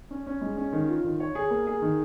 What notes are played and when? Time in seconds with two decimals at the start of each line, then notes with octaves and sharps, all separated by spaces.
0.11 C#4
0.26 C#4
0.41 G#3
0.57 C#4
0.72 D#3
0.88 F4
1.04 D#3
1.20 C#5
1.35 G#4
1.50 A#3
1.67 G#4
1.82 D#3